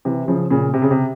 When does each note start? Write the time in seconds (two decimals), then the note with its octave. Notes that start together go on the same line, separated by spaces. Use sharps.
0.05 C3 E3
0.28 C#3 F3
0.50 A#2 C#3
0.74 C3
0.82 C#3
0.91 C3